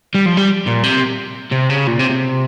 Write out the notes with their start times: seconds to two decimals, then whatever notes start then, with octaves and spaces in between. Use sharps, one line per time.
0.14 G3
0.26 F3
0.37 G3
0.66 A#2
0.83 C3
1.52 C3
1.70 C#3
1.87 A#2
1.99 C3
2.09 C3